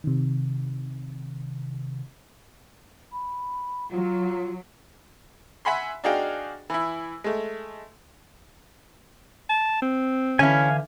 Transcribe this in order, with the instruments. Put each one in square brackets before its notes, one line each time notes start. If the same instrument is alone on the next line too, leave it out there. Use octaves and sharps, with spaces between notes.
[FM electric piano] C3 D#3
[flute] B5
[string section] F#3 [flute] F4
[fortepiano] E5 F#5 G#5 B5 C6
D4 D#4 F#4 G#4 F5 G5
E3 E4
G#3 A3
[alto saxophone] A5
C4
[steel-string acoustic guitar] D3 E3 E5 [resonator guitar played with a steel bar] C#4 E4 [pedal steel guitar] F5 G#5